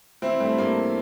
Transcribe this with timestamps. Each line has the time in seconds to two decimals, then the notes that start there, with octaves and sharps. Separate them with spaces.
0.22 E3 C4 E4
0.40 G2 A3 C4
0.58 G2 A#3
0.76 E3